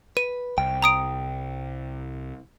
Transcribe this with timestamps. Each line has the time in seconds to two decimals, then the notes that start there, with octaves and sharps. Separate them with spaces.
0.17 B4 D#7
0.58 C2 G5
0.82 A#5 D#6 D7